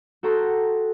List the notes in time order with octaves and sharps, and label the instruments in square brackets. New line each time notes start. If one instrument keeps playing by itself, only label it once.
[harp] F#4 A4 G5 A#5 C6